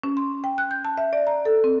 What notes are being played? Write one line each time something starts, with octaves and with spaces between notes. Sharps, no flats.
C#4
C6
G5
F#6
G6
A5
E5
D5
A#5
A4
C4